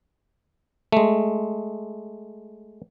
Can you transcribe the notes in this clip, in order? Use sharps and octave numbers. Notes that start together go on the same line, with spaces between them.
G#3 A3